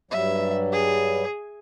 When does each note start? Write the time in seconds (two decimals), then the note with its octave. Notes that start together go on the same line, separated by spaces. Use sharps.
0.11 G2 F#3 G3 E5
0.73 G#4